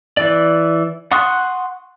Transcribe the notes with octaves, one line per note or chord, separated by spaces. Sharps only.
E3 D5
F#5 C6 C#6 D#6 F#6